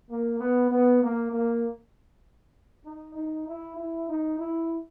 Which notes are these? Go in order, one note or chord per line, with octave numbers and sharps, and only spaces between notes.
A#3
B3
B3
A#3
A#3
D#4
D#4
E4
E4
D#4
E4